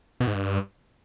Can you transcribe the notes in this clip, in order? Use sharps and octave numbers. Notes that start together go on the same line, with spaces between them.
B2
G#2
G2